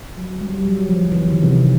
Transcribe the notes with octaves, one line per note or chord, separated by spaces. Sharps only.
F#3
G3
F#3
F3
E3
D#3
C3